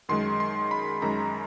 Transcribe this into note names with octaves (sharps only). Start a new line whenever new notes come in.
F#2 D#3 G#3 C6
C6
B5
F#2 D#3 G#3 A#5